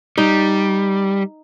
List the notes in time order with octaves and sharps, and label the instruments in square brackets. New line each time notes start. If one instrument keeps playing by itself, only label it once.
[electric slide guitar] G3 [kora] D#4